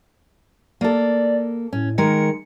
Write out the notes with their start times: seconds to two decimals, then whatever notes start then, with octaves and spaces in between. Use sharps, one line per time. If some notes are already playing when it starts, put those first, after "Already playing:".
0.81 A#3 A4 D5
1.73 A2 C#4
1.98 D#3 G#3 A#4 C#7